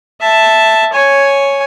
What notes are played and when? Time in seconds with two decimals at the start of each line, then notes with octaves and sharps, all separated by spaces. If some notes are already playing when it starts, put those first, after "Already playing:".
0.21 E5 A5
0.93 C#5 G#5